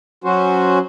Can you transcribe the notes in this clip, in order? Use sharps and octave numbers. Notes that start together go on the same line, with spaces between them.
F#3 C#4 F#4 C5